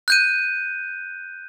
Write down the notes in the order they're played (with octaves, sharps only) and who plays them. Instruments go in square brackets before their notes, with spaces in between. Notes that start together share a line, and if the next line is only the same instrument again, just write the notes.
[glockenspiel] F#6 G6 D#7